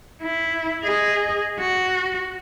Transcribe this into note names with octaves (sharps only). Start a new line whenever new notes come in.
E4
G#4 D#5
F#4